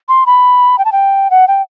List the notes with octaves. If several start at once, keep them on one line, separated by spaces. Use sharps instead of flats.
C6
B5
G5
A5
G5
F#5
G5